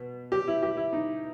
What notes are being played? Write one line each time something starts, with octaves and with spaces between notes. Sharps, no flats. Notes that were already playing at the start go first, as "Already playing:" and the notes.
Already playing: B2
G4
E4
G4
E4
D#4